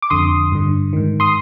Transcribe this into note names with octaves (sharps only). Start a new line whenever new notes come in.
D6
F2 D3 C6 D#6
G2 D3
G#2 D#3
C6 D#6